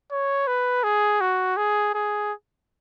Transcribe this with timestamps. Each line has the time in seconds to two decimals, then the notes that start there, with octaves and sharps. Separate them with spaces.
0.11 C#5
0.47 B4
0.84 G#4
1.21 F#4
1.57 G#4
1.94 G#4